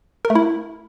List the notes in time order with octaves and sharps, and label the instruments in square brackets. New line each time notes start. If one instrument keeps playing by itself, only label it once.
[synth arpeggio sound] A#4
A3
E4